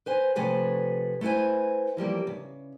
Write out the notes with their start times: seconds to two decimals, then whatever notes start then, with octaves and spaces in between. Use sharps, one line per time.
0.06 B4 C5 G#5
0.36 C3 F3 A3 B4 C#5 G#5
1.21 A3 E4 B4 C5 G#5
1.97 E3 F3 G3 A#3
2.27 C#3